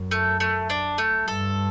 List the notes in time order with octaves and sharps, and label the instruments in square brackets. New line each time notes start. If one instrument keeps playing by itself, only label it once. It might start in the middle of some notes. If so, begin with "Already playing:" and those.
Already playing: [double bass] F#2
[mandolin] A3
A3
D4
A3
[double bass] G2 [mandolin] A4